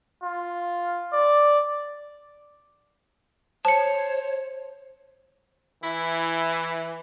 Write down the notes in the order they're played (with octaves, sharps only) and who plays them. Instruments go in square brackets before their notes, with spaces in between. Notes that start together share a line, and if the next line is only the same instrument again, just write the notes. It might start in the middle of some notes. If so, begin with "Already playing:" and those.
[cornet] F4
D5
[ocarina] C5 [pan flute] C#5 [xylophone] A5 C#7
[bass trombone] E3 [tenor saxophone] E4